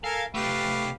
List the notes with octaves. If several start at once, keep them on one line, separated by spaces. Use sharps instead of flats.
A4 A#4 F5 G#5
C3 A3 G4 B4 F5